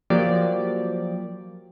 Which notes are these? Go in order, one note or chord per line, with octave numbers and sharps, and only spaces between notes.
F3 F#3 A#3 G4 D5